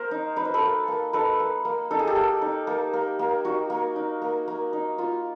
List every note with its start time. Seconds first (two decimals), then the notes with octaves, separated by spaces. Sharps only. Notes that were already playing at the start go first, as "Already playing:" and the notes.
Already playing: A#3 A#4 C5
0.11 D#4
0.36 D#4 B4
0.45 C5
0.54 A4 B4
0.62 A#3
0.88 A#3
1.13 D#4 A4 B4
1.40 A#3
1.65 A#3
1.91 D#4 A4
1.99 G#4
2.07 G4 A4
2.16 A#3
2.42 D#4
2.67 A#3
2.93 A#3
3.19 A#3
3.45 D#4 F#4
3.70 A#3
3.96 D#4
4.22 A#3
4.48 A#3
4.73 D#4
4.98 A#3 F4